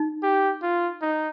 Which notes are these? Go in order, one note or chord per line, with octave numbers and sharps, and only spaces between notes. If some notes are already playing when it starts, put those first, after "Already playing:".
Already playing: D#4
G4
F4
D#4